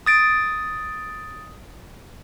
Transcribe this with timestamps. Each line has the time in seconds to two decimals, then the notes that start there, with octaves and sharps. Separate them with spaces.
0.06 D#6 A6 D7